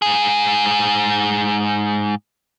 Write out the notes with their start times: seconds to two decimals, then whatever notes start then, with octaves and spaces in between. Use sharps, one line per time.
0.02 G#2 G#4